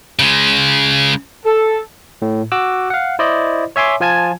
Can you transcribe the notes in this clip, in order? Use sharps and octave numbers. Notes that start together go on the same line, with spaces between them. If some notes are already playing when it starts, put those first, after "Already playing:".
C#3 G#3
A4
A2
F#4 D6 E6 F#6
F5 F#5
E4 C5 D5 D#5
C#5 E5 G#5 C6 D6
F3 F4 G#5 A5 G#6